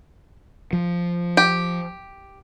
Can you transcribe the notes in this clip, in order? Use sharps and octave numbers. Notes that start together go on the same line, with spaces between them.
F3
G4